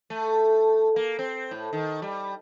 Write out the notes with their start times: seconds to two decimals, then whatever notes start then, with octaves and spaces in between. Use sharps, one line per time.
0.10 A3
0.96 A#3
1.19 C4
1.51 A2
1.73 D#3
2.02 G3